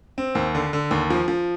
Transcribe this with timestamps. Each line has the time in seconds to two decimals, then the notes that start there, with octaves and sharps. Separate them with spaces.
0.18 C4
0.35 D#2
0.55 D3
0.73 D3
0.91 D#2
1.10 F3
1.28 F3